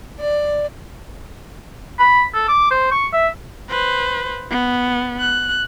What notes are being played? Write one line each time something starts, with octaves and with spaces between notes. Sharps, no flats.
D5
B5
A4
D6
C5
C#6
E5
B4 C5
B3
F#6